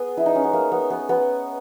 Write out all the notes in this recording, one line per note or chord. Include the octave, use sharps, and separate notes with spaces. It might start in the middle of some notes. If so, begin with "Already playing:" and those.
Already playing: B3 G#4
E4
D#4
C#4
B3
A#3
B3
B3
B3